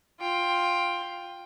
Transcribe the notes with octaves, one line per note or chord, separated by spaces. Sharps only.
F4 G5